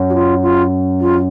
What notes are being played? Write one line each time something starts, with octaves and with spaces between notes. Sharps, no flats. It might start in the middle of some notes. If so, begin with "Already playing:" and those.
Already playing: F#2
F#4
F4
F4
F4